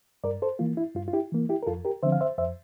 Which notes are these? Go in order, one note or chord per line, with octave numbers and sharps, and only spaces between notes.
G2 A#4 D5
A4 C5
E3 A#3 F4
E4
G2 F4
F4
E4 G4
E3 A#3
E4 G4
A#4
F2 F4 A4
G4 A#4
D3 F3 C4 C5 E5
F5
C5 E5
F2 C5 E5